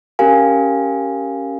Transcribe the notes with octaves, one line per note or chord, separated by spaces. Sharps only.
C#4 G4 A#4 F5 G#5